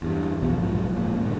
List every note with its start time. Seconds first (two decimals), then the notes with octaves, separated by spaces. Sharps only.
0.02 E2 G2
0.42 A#1 E2 B2 F3
0.61 B1 G#2 F3 F#3
0.95 D1 C#2 A#2
1.23 D1 G2 D#3